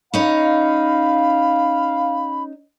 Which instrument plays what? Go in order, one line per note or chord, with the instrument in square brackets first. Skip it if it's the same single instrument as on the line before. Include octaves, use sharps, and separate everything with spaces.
[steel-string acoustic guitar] C#4 D#4 [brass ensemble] F5 [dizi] B5